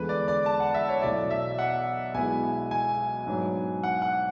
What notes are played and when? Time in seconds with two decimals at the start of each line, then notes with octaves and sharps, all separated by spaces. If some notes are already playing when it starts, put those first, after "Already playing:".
Already playing: E2 D3 G#3 B4
0.09 D5
0.28 D5
0.46 A5
0.60 F#5
0.74 E5
0.88 C#5
1.02 B1 B2 A3 E4 D5
1.30 E5
1.59 F#5
2.14 B1 B2 G#3 B3 E4 G#5
2.71 G#5
3.27 G#2 F#3 B3 D4
3.84 F#5
4.02 F#5